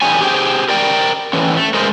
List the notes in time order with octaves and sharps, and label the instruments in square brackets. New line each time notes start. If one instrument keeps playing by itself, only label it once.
[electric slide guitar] E2 D3 B3 G4 C#5 G#5
G4 G#4 C5 G5
A#4 D5 G5
D3 E3 C#4
A3
G#3 A3 A#4 C5 D#5